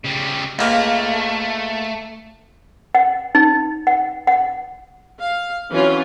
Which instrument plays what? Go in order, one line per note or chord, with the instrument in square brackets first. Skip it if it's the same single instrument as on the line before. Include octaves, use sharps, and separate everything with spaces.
[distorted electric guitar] C#3 G3
[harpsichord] C#2 A#3 [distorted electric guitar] A3
[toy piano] F#5
D#4
F#5
F#5
[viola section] F5
E3 F#3 C4 C#4 F4